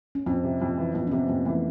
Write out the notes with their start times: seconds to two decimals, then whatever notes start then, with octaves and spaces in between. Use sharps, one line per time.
0.15 C#4
0.26 F2 C4
0.44 C3
0.62 F2
0.77 E3
0.94 F2 B3
1.07 C#4
1.11 C3 C4
1.29 F2 A#3
1.45 E3 A3